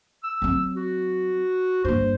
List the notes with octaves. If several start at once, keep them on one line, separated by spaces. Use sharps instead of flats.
E6
F#3 C4
F#4
G2 A#3 C5